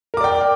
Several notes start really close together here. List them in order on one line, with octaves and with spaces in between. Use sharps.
A#4 D6 D5 G5